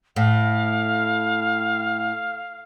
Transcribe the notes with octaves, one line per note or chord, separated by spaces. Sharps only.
A2 F5